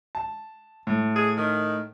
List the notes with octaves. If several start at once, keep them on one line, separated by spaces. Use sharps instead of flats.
A5
A2
G#4
D#3